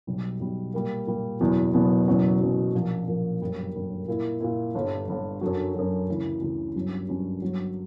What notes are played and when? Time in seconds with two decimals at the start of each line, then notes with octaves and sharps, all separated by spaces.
0.07 B1 B2 G3
0.40 B1 B2 G3
0.74 A#2 G3 A#3
1.07 A#2 G3 A#3
1.40 F#1 E2 B2 F#3 B3
1.74 F#1 E2 B2 F#3 B3
2.08 F#1 E2 B2 F#3 C#4
2.41 F#1 E2 B2 F#3 C#4
2.74 A#1 A#2 A#3
3.08 A#1 A#2 A#3
3.41 G1 F#2 D3 G3 A#3
3.74 G1 F#2 D3 G3 A#3
4.08 A#2 A#3 E4
4.41 A#2 A#3 E4
4.75 G1 G2 D3
5.08 G1 G2 D3
5.41 F#2 D3 F#3
5.75 F#2 D3 F#3
6.09 D2 C#3 E3
6.42 D2 C#3 E3
6.75 G1 G2 F#3 C#4
7.09 G1 G2 F#3 C#4
7.42 G1 G2 F#3